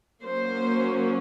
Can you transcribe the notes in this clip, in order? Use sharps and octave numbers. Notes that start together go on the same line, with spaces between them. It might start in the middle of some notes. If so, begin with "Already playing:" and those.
F#3 A#3 C#4 C5